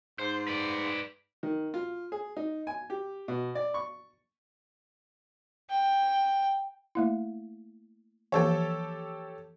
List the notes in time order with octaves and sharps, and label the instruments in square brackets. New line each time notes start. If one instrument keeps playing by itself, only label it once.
[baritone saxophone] G#2 [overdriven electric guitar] C5
[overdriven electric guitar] B4 D5
[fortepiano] D#3
F4
G#4
D#4
G#5
G4
B2
D5
C#6
[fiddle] G5
[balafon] A3 A#3 E4
[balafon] E3 F3 A#3 [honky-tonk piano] G4 A4 C#5